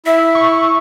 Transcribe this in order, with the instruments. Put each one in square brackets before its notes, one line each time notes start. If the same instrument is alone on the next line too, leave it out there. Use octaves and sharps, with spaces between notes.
[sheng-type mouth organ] E4 [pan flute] E5
[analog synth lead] C#6